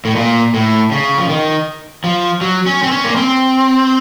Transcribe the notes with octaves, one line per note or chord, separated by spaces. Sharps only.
A2
A#2
A2
C#3
F3
D#3
F3
F#3
C#4
C4
C#4
A#3
C4